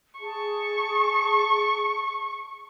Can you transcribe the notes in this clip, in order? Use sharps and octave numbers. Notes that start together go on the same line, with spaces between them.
G#4 A5 C#6